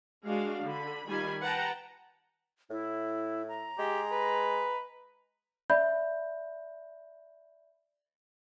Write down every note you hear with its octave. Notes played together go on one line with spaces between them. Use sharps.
G#3 D4 F#4 F5
D3 B5
D#3 G3 F4 G#5 B5
B4 F#5 G5 A5 A#5
A2 E4
A#5
G#3 G4
B4
D5 E5 B5 G6